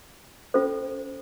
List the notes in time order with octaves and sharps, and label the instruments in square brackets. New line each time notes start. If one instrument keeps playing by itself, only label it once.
[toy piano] C#4 F4 A4 C5